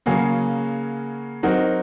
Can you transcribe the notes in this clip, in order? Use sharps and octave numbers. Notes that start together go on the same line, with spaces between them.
C#3 F#3 A#3 C#4 G#4
F#3 C4 D#4 F#4 A#4